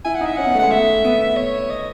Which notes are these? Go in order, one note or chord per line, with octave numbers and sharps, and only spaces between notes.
E4 G#5
F#5
D#4 E5
C#4 F#5
B3
A3
G#3 F#5
A3 E5
B3
C#5
D#5